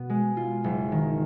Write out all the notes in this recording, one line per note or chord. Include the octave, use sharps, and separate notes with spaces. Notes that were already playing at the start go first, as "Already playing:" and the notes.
Already playing: B2 B3
G#3
F4
F#1
D#3